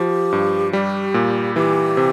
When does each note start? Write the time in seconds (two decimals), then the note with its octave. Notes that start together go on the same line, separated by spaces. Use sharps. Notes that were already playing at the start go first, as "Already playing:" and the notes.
Already playing: F3 G4
0.32 G2
0.73 G3 G4
1.14 A#2
1.55 E3 G4
1.97 C3